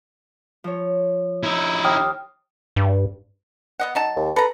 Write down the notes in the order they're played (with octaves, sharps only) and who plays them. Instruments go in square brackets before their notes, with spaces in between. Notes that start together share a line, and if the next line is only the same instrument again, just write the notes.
[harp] F3 C#5
[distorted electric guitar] D#4 E4
[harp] D#2 [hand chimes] G5 D#6 F6
[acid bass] G2
[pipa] B3 D#5 F#5
F#3 D#4 A5
[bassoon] D#2
[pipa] A4 A#5 [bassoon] B4